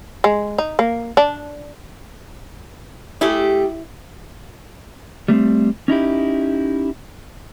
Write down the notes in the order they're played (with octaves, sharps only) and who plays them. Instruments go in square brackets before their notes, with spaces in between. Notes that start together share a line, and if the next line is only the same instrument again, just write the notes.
[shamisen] G#3
D#4
A#3
D4
[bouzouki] A3 G4 G#4 [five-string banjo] E4
[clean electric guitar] G3 A3 A#3 C4
C#4 D#4 E4 G4